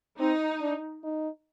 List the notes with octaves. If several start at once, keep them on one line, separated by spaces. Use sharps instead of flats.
C4 D#4
D4
D#4